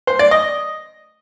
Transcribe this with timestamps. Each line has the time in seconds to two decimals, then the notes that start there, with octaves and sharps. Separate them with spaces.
0.07 C5
0.19 D5
0.31 D#5